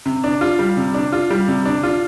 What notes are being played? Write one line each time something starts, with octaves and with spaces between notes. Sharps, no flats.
C3
D4
F4
G3
C3
D4
F4
G3
C3
D4
F4